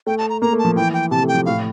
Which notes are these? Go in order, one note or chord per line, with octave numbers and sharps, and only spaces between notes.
A3 G5
A5
A#5
A#3 A#5
A3
A5
F3
E3 G5
G5
C3 A5
A3
G5
F3
A2 F5